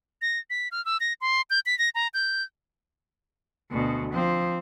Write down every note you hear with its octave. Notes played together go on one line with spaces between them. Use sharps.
A#6
B6
F6
E6
A#6
C6
G6
B6
A#6
A#5
G6
D2 B2
F3 C4